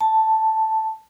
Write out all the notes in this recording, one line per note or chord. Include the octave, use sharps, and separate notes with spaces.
A5